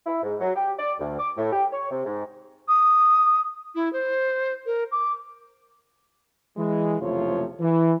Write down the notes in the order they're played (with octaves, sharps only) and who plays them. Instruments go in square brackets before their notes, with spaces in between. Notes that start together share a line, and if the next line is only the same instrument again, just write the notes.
[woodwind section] E4
G#2
F#3
G4
D5
D2
D6
A2
G4
C#5
C3
G#2
[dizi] D#6
E4
C5
A#4
D6
[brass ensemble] E3 G#3
F#1 C3 F3 A3 F4 C#5
E3